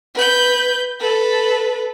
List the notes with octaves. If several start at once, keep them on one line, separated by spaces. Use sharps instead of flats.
B4 G6
A4 B4